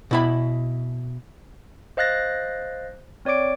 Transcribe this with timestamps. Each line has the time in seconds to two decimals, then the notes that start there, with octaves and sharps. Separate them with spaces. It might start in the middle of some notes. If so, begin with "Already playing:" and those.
0.11 B2 E4 B5
1.97 C5 D#5 F5 F#6 A6 A#6
3.25 C4 C#5 D5 D6 D7